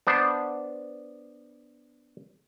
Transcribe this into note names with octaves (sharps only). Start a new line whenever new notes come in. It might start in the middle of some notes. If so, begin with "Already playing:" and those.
B3 D4 C5